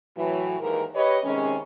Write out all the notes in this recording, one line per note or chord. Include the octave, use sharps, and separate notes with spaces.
A2 E3 F#3
D#2 G#2 E3 A#4
G4 B4 C#5 D#5
C3 D#3 G#3 C#4